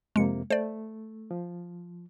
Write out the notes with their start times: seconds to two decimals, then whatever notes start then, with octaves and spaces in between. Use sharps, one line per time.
0.16 F2 C3 G#3 A#3 C#7
0.50 A3 C5 D5
1.31 F3